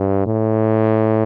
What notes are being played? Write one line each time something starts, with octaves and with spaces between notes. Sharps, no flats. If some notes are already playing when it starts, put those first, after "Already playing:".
Already playing: G2
A2